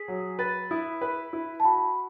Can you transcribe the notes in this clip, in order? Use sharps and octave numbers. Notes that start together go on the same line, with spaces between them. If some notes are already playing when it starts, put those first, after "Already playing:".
Already playing: G#4 B6
F#3
B4 A6
E4 D#6
B4
E4
A5
F#4 B5